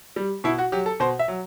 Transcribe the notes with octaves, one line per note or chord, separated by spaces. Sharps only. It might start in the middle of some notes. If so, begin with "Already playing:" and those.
G3
B2 E4
F#4
F#3 G4
A4
B2 C5
E5
F#3